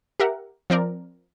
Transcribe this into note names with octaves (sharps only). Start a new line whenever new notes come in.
G4 A#4 E5 F#5
F3 C4 A#4 D5